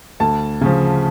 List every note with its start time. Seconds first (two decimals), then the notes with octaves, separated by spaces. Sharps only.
0.20 D2 A5
0.61 C#3 F3